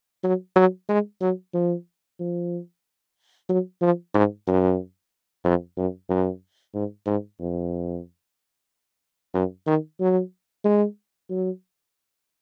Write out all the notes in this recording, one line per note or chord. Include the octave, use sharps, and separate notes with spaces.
F#3
F#3
G#3
F#3
F3
F3
F#3
F3
G#2
F#2
F2
F#2
F#2
G#2
G#2
F2
F#2
D#3
F#3
G#3
F#3